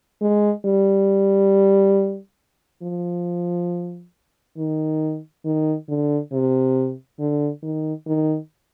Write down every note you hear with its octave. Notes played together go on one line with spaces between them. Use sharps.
G#3
G3
F3
D#3
D#3
D3
C3
D3
D#3
D#3